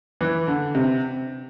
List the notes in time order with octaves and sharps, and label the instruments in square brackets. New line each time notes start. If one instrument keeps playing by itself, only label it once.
[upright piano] E3
D3
C3